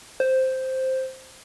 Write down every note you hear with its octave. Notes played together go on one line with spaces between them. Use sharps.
C5